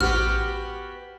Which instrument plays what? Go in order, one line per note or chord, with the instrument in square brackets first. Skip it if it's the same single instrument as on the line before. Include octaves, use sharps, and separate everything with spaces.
[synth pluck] A1 [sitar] B3 G4 B4 [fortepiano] F#4 [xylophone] F6